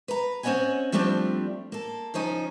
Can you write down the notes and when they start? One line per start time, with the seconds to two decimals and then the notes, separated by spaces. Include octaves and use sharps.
0.08 B4 A#5
0.43 C4 C#4 C#5 D#5 F#5 G#5
0.92 F3 G3 A3 C4 D4 F4
1.72 A#3 A4
2.14 C#3 F3 C#4 D#4